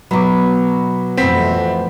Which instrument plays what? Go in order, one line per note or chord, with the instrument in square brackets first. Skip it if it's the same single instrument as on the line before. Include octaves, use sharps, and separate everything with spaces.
[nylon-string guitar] B2 F#3 [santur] B4 A#5 D6
[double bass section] F2 E3 A3 [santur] B3 B4 [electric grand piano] C4 B6